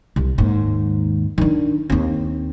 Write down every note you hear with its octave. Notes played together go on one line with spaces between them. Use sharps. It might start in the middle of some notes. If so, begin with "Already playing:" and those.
C2
D#2 G#2
D#3 D4
D#2 C4